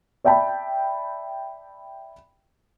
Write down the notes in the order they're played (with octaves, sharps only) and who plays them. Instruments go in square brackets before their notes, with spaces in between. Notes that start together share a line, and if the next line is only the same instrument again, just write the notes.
[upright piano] D5 E5 G5 A5 B5